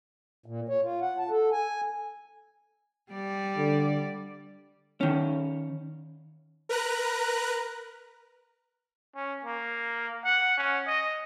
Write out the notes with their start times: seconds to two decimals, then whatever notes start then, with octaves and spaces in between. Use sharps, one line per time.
0.46 A#2
0.69 C#5
0.83 F4
1.01 F#5
1.18 A5
1.30 A4
1.52 G#5
3.12 G3 D5
3.57 D3
5.01 D#3 C#4
6.69 A#4 B4 A#5 F#6
9.16 C#4
9.45 A#3
10.25 F#5
10.58 C#4
10.87 D#5